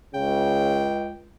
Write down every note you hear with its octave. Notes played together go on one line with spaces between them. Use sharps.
C#2 C#3 G5